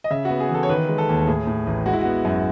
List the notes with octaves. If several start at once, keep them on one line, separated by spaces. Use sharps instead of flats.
D#5
C#3 E5
F#4
B3
G#4
E3
A4
C#5
D#3 B4
G#3
A4
D#2
A2 G#4
A2
A1
G#3 F#4
E4
B3 F#4
F#2